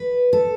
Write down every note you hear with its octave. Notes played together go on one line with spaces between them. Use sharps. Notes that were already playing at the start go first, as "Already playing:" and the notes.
Already playing: B4
A4